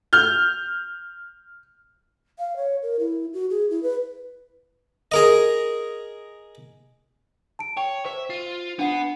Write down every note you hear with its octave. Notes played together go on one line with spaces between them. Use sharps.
F6 G6
F5
C#5
A#4
E4
F#4
G#4
E4
B4
G#4 A#4 D#5
A5 D7
C#5 G5
C5 E5
F4
B3 D4 F#5 C7